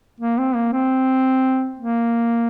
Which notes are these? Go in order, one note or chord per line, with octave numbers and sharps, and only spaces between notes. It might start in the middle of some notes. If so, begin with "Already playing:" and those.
A#3
C4
A#3
C4
A#3